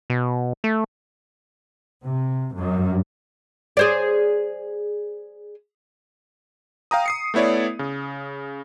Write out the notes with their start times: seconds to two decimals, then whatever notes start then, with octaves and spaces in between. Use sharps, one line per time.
0.10 B2
0.64 A3
2.05 C3
2.56 F#2
3.77 G#4 C5 D5
6.91 F5 G5 A#5 D#6
7.06 D#6 C7 C#7
7.34 A3 B3 E4 C#5 D5
7.79 C#3